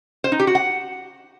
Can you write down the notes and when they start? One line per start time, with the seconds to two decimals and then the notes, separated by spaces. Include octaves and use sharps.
0.24 C5
0.32 D#4
0.40 G4
0.47 F#4
0.55 F#5